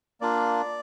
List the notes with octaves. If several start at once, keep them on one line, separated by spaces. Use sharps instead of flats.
A#3 D4 F4 D5